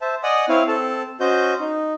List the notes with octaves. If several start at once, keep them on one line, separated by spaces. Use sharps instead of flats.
C5 E5 A5
D5 D#5 F#5 G#5 D#6
C4 E4 C#5 F5
C4 A4 A5
C#4 F#4 C5 D#5 G6
D#4